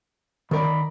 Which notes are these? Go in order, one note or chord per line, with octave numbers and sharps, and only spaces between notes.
D#3 A#4 D5 B5